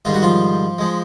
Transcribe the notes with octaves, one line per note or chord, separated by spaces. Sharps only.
G#2 D#3 G3 F4
F#4
F3 F4
F3 G#3